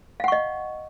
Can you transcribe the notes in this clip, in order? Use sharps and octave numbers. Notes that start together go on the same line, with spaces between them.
D#5 F5 F#5 C#6